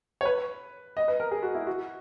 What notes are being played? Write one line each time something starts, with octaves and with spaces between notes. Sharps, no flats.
C#5
B4
D#5
B4
A#4
G#4
F#4
E4
F#4